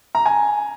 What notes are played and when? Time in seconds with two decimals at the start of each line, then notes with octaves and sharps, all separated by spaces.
0.15 A#5
0.26 G#5